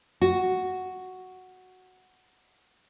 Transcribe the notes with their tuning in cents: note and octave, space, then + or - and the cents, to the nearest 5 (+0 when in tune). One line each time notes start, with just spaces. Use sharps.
F#4 +0